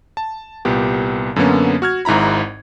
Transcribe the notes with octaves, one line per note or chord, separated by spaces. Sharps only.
A5
C2 A#2 B3 G4
F#2 D3 F#3 A#3 B3 C#4
F#4 F6 G#6
G#1 G#2 E4 A#5 B5